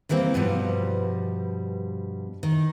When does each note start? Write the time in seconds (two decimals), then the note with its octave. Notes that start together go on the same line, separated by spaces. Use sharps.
0.09 D#3 E3 G3 A#3 C4
0.34 G2 B2 F3 G3
2.43 D#3